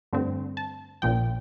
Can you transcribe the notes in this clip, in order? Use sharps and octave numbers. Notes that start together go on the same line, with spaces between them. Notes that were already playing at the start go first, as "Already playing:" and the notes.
G2 D3 A3 C4
A5
A#1 A#2 F3 G5